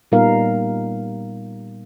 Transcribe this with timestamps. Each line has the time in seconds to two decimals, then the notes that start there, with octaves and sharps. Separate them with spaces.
0.12 A#2 G3 B3 D#4 A#4 F5